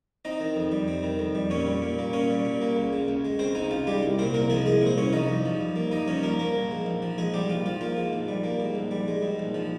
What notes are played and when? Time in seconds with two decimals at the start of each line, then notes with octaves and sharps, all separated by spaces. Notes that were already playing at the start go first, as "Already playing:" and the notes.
0.25 C4 D#4 D#5
0.40 D#3
0.56 F2
0.72 G3
0.88 C4
1.03 D#3
1.19 F2
1.35 G3
1.50 A#2 C#4 C#5
1.67 G3
1.82 A#2
1.99 A#3
2.13 A#2 C#4 C#5
2.30 G3
2.45 A#2
2.61 A#3
2.76 C#2
2.93 C#3
3.08 C#2
3.25 G#3
3.39 C#2 C4 C5
3.55 C#3 D#4
3.71 C#2 F4
3.87 G3 G#3 G4
4.03 C2
4.19 A#2 C4 C5
4.34 C2 A#3 A#4
4.50 F3 G#3 G#4
4.65 C2 G#3 G#4
4.81 A#2
4.86 C5
4.98 C2 C#4 C#5
5.13 F3 D#4 D#5
5.29 G2
5.45 F3
5.61 G2
5.76 A#3
5.92 G2 D#4 D#5
6.08 F3 C#4 C#5
6.23 G2 A#3 A#4
6.39 A#3 A#4
6.55 A#1
6.71 G#2
6.86 A#1
7.02 F3
7.18 A#1 G#3 G#4
7.34 G#2 G3 G4
7.49 A#1 F4
7.66 F3 F4
7.81 A#3 F4
7.97 G#2
8.13 A#1
8.28 G3
8.44 A#3
8.60 G#2
8.75 A#1
8.91 G3
9.08 G#3
9.22 G#2
9.39 A#1
9.54 F3